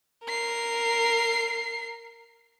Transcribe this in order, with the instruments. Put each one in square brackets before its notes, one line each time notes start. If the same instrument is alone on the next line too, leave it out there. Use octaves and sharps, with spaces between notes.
[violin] A#4 C7